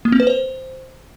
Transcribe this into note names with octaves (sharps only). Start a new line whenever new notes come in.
A#3
C4
B4
C5